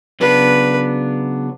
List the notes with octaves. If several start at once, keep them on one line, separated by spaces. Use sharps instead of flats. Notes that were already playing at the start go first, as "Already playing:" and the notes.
C#3 F#3 B3 D4 B4